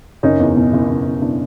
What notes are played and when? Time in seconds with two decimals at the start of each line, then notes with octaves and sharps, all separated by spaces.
0.23 F#1 C#4 D#4
0.40 E2
0.56 B2
0.73 F#1
0.89 F#1
1.05 E2
1.21 B2 D4 E4